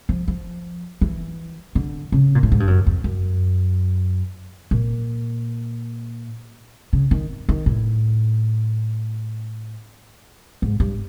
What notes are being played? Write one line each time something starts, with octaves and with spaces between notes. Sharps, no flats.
F3
F3
E3
D3
C#3
A#2
A2
G#2
G2
F#2
F2
F#2
A#2
C#3
D#3
D#3
A2
G#2
G2